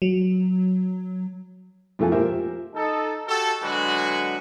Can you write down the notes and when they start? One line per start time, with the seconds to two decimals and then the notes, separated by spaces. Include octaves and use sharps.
0.02 F#3
1.99 F2 F3 A3 F4 G#4 G#5
2.12 F3 G4 A#4 C5 E5
2.75 D#4 A4
3.27 F#4 G4 A4
3.62 D3 F#3 G#3 F#4 B4